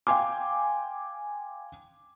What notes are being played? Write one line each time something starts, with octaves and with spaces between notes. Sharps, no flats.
F5 G5 G#5 C6 D6